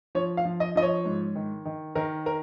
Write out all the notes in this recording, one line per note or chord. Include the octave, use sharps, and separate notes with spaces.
F3 C#5
F5
F3
D#5
F3 D#5
C#5
G#2
D#3
D#3
D#3 A#4
A#4